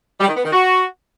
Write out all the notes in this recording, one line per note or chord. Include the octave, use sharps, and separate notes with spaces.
G3
D#3
B3
D#3
F#4